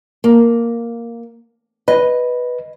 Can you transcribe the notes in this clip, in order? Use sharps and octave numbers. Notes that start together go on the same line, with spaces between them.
A#3
B4 D#5